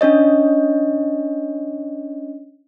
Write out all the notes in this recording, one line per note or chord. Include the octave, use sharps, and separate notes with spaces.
C#4 D4 C#5 D#5